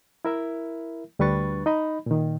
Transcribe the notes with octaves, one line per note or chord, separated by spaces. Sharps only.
E4 A#4 E5
D2 G3 D4 B4 C#6 A6
D#4 D#5 B5
A#2 D#3